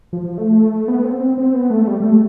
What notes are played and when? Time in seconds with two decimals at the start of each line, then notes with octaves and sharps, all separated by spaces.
0.13 F3
0.38 A3
0.88 B3
1.04 C4
1.20 C4
1.38 C4
1.54 B3
1.70 A3
1.87 G3
2.00 G3
2.03 A3